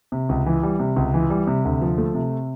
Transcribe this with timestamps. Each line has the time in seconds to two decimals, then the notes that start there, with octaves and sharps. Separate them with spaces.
0.12 C3
0.29 C#2
0.46 E3
0.63 G3
0.79 C3
0.96 C#2
1.14 E3
1.30 G3
1.47 C3
1.65 D2
1.82 F3
1.98 A3
2.15 C3